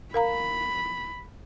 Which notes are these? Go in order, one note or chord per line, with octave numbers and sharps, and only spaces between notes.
A#4 F5 A#5 B5